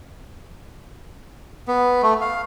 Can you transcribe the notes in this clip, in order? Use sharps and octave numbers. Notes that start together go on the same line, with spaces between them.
B3
A3
F5